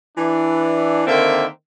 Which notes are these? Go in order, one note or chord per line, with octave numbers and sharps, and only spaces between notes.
E3 D4
D3 D#3 A#3 C4 E5